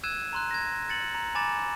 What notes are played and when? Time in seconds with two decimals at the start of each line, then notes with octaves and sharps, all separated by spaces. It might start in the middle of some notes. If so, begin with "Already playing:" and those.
0.03 E6 F#6 G#6 D#7 E7
0.33 A#5 C6 F#6
0.51 G#6 A#6
0.89 A6 C#7 F#7
1.15 A#5
1.35 G#5 A#5 B5 D6 A6 E7